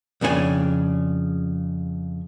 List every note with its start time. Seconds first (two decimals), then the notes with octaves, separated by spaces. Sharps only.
0.21 F2 C#3 D4 E4 C#5 G#5